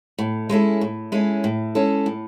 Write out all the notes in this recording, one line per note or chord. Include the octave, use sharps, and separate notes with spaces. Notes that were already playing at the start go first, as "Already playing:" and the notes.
A2
G#3 C#4 E4 A4
A2
G#3 C#4 E4 A4
A2
G#3 C#4 E4 A4
A2